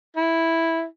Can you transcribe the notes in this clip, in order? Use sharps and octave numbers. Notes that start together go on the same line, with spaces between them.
E4